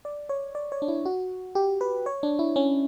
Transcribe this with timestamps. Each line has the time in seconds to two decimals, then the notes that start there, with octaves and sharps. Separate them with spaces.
0.05 D5
0.29 C#5
0.55 D5
0.72 C#5
0.82 D4
0.88 E4
1.05 F#4
1.55 G4
1.81 B4
2.06 C#5
2.23 D4
2.39 E4
2.56 C#4